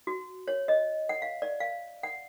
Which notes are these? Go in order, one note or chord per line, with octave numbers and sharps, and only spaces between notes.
F#4
C#5
D#5
F#5
F5
D5
F5
F#5